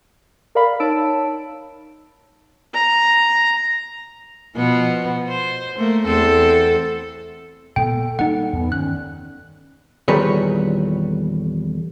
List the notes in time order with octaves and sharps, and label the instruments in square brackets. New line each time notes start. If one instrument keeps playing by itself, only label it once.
[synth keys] A#4 D5 F5 B5
D#4 C#5 A5 E6 D7
[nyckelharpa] A#5
[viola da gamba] B2 F3 B3
C5
A3 A#3
E2 C4 A4
[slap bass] A#2 G#3 B3 [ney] A4 [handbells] G5
[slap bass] G3 A#3 [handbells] D#4 F#5
[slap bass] E2 [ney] B3
[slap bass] G2 D#3 [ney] C#4 [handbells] F#6
[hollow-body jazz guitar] E2 A#2 D#3 G3 B4 C#5